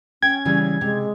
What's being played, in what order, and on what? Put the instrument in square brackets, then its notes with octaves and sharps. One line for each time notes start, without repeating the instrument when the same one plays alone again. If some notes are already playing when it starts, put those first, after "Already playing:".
[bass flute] C#4 [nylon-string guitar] G5 [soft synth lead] G#6
[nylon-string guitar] C#3 E3 G3
[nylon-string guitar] C3 [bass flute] G#3